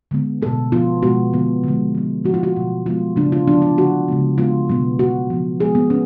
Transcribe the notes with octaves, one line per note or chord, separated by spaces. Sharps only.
D3 G#3 B3
B2 A3 A4
F3 B3 F4
B2 G#3 B3 F#4
D3 F3 G#3 B3
D3 F3 G#3
F3 B3
F3 A3 F#4
F4
F#4
B2 F#3 A3
F3 G#3 B3 F4
C#3 F#3 A3 D4
F4
D3 F3 B3 D4
F4
D3 F#3 A3 F#4
C#3 G#3 B3
C#3 G#3 B3 F4
B2 F#3 B3
B2 A3 F#4
F3 B3
F3 G#3 B3 G#4
B3
C#4